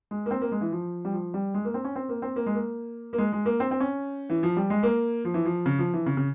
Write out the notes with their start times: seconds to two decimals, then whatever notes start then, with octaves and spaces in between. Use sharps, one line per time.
0.11 G#3
0.26 A#3
0.31 C4
0.41 A#3
0.52 G#3
0.61 E3
0.72 F3
1.05 G3
1.13 F3
1.34 G3
1.54 G#3
1.65 A#3
1.74 C4
1.85 C#4
1.96 C4
2.09 A#3
2.22 C4
2.36 A#3
2.46 G#3
2.55 A#3
3.13 A#3
3.18 G#3
3.33 G#3
3.46 A#3
3.60 C4
3.71 C4
3.80 C#4
4.30 E3
4.43 F3
4.57 G3
4.70 G#3
4.83 A#3
5.25 F3
5.34 E3
5.45 F3
5.66 C#3
5.79 F3
5.94 E3
6.06 C#3
6.17 C#3